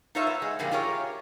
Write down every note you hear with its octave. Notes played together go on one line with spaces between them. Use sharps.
D#4 F4 A4 C#5 E5 F5
B3
G#3
A#2 D3 F3 G3 A#3
F4 G4 G#4 A#4 C#5